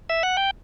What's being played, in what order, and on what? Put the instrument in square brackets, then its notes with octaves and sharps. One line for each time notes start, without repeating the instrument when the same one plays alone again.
[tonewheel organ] E5
F#5
G5